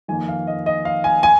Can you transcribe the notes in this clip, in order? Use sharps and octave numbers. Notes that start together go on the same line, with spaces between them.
F2 D#3 A#3 G#5
F5
D#5
D#5
F5
G#5
G#5